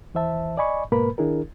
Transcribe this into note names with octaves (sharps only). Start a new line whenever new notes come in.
D#2 E3 C5 E5 A5
D5 D#5 G#5 B5 C#6
G#2 B2 A#3 A#4 B4 B5
D#3 D4 E4 G#4 A#4